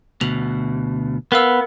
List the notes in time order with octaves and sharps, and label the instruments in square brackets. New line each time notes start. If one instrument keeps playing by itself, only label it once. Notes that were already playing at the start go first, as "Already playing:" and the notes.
[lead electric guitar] D2 B2 [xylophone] F7 F#7
[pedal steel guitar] B3 [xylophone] A#4 F5 E6